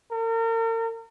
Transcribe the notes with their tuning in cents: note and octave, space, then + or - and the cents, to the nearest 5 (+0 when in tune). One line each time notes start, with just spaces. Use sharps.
A#4 -40